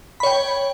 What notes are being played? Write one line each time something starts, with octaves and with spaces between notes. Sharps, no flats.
C#5 G5 B5